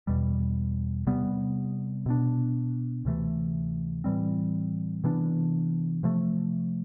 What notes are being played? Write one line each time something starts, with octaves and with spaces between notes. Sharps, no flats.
E2 B2 G3
C3 G3 B3
B2 B3 D4
D2 C3 E3 A3
A2 E3 G3 C4
C3 E3 B3 D4
C3 F3 A3